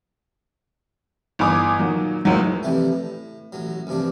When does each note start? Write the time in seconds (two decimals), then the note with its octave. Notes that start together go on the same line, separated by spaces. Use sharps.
1.39 G1 E3 G#5 D6 D#6
1.79 A#2 D#3 F#3
2.25 F#1 C#2 A2 E3 F#3
2.63 F2 C3 E3 G3 A3
2.92 A2
3.52 A1 A2 F#3
3.87 A1 G2 C3 F3 D4